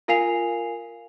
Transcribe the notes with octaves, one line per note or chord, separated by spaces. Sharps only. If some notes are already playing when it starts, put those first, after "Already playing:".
F4 A#4 F5 G#5 C7 F7